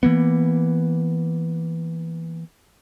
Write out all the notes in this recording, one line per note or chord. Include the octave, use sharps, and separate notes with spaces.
E3 A#3 B3